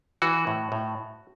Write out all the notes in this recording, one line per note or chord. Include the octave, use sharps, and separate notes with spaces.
E3 F#4
A2
A2